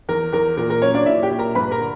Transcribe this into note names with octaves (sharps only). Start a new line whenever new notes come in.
E2 A#4
E2 A#4
A#2 A#4
A#4
F#3 C#4 C#5
D4 D5
A#2 E4 E5
G4 G5
A#2
A#4 A#5
G2 B4 B5
A#4 A#5
D3